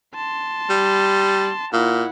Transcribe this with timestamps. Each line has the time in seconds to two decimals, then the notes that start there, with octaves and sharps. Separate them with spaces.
0.15 A5 C6
0.70 G3
1.73 A#2 E4 F#5